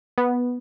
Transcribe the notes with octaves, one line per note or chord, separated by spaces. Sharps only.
B3